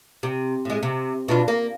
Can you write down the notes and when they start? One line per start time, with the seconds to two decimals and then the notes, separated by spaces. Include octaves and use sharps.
0.23 C3
0.65 A2 G#3
0.83 C3
1.28 B2 D4 F4
1.48 A#3